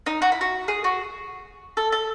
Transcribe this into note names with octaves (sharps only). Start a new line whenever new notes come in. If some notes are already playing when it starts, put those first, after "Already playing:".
D#4
F#4
E4
F#4
G#4
F#4
A4
A4